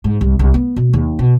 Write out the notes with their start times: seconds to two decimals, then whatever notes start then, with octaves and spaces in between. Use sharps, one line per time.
0.04 G#2
0.21 C2
0.39 C2
0.54 B3
0.76 B2
0.93 D#2
1.19 B2